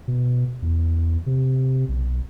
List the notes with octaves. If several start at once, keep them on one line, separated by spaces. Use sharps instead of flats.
B2
E2
C3
B1